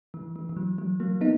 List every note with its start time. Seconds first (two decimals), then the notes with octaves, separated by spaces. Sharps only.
0.14 E3
0.36 E3
0.49 E3
0.57 F#3
0.78 F#3
1.00 F#3 A#3
1.21 B3 D#4